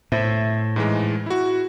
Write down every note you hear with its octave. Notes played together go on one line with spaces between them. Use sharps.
A2 C5 E5
G#2 E3 G#3
E4 F#4